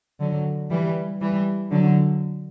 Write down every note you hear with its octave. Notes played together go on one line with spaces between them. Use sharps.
D3 F#3
E3 G3
E3 G3
D3 F#3